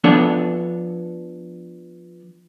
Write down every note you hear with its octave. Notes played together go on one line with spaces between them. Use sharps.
F3 B3 D4 A4 C#5